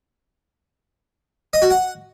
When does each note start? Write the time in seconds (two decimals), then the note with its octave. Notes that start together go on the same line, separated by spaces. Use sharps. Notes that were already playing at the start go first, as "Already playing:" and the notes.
1.53 D#5
1.62 F#4
1.70 F#5